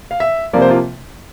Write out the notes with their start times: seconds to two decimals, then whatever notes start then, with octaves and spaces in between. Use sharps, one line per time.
0.11 F5
0.20 E5
0.53 C3 F3 A#3 D5
0.62 C5
0.70 F4